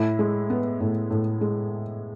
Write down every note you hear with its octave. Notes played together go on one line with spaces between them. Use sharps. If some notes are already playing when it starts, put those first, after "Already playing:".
Already playing: A2 E4
G#3
B3
A2
A2
G#3